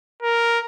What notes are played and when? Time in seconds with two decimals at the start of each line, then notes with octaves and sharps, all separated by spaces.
0.22 A#4